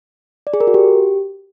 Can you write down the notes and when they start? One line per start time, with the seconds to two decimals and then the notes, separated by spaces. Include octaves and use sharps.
0.47 D5
0.54 G#4
0.60 A#4
0.67 F#4
0.74 G4